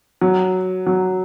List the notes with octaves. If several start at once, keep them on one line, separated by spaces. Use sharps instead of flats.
F#3
F#3